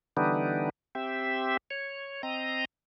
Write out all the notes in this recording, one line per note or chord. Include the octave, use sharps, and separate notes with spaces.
D3 E3 G3 B3 D4 D#4
C4 G4 E5
C#5
C4 D#5 A#5